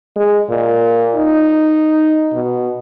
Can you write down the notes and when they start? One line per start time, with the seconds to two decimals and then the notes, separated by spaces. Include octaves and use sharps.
0.16 G#3
0.49 A#2
1.16 D#4
2.33 B2